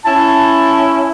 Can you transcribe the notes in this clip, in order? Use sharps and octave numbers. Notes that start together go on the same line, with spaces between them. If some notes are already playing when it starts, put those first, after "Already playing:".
C#4 E4 A5